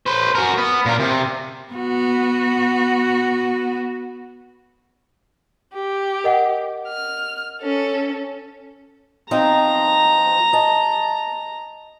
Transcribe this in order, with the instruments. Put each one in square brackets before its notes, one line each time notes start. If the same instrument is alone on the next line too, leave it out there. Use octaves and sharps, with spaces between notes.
[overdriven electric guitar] B4 C5
F#4 A#4
B3
A#2 A#4
C3
[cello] B3 F#4
[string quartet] G4
[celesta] A#4 D#5 F#5
[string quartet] F6
C#4 A4
[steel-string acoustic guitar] F3 C4 D#4 [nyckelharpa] A#5
[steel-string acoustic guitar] D#5 A5